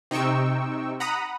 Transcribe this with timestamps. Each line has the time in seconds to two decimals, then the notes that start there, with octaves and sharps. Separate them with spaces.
0.11 C3 D#4 G5 C#6 E6
1.00 F#5 A#5 B5 D#6